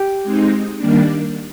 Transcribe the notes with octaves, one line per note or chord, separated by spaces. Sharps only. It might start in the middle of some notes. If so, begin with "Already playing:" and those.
Already playing: G4
G#3 C4 D#4
D#3 G3 A#3 D4